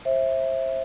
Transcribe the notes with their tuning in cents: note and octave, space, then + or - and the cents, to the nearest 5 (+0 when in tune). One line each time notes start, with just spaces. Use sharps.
C5 +30 E5 +0